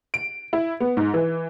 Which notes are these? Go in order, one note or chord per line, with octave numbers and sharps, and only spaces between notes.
D7
E4
B3
G#2
E3